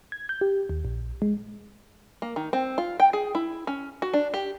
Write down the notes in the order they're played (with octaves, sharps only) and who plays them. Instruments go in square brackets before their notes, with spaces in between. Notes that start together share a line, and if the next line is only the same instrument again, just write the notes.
[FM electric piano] G#6
G6
G4
D#2
A#1
G#3
[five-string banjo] A#3
D#3
C4
F4
G5
G#4
E4
C#4
F#4
D4
G4